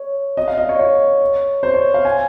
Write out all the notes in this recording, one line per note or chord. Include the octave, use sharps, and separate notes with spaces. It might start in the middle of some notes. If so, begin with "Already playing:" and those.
Already playing: C#5
D#5
F5
D#5
C#5
C#5
C5
C#5
F5
G#5